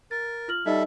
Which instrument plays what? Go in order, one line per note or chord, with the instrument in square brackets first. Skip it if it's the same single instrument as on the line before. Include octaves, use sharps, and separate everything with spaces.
[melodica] A#4 [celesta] A6
[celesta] F4 F6 F#7
[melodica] G3 A4 E5 [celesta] D#4 D#5